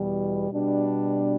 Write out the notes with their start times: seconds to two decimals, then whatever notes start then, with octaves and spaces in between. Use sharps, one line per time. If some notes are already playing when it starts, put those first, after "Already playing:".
Already playing: E2 B2 G3
0.50 B2 G3 D4